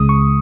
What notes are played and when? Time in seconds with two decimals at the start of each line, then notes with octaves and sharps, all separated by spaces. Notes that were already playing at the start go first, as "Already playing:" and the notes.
Already playing: C#2 C#3 G#3 D#6
0.09 C#6